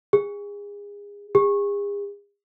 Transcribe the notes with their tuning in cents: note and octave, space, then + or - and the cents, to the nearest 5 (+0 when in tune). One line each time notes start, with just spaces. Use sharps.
G#4 -30
G#4 -45